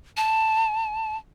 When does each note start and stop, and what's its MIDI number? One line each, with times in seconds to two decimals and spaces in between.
0.17 1.17 81